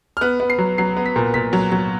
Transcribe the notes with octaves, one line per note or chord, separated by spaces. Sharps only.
F6
B3 F#6
B3
C7
F#3
F#3 C7
B3
B6
A#2
A#2 B6
F#3
F#3